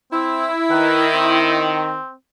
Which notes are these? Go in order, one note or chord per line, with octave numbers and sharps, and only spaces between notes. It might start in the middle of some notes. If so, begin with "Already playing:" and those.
C4 E4
D#3 B4
C4